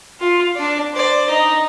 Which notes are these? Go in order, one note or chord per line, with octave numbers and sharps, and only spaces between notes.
F4
D4 D5
C5 D5
D#4 D#5